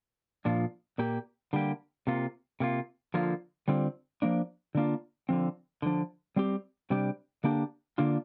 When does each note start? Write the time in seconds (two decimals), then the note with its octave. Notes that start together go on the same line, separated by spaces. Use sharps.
0.45 A#2 F3 D4 F4
0.98 A#2 A#3 G4
1.53 D3 G3 A#3 G4
2.07 C3 A#3 F4
2.60 C3 A#3 F4
3.14 D3 F3 A#3 F4
3.68 D3 G3 C4 F4
4.22 F3 A#3 D4
4.75 D3 A#3 D4 F4
5.29 D3 F3 C4
5.82 D3 F3 D4
6.36 G3 C4 G4
6.90 C3 G3 D4 G4
7.44 D3 A#3 D4 G4
7.98 D3 A#3 D4 F4